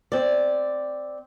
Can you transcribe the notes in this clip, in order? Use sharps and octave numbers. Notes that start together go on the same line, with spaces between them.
C4 D5